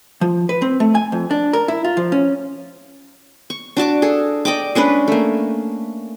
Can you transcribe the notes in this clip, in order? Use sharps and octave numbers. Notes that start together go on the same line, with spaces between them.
F3
B4
C4
A3
G#5
F2
D4
A#4
E4
F4
F3
C#4
C#6
D4 F#4 A5 D6
G#4 A4
D5 D#5 G5 D6
G#3 C#4 D4 B4
A3 A#3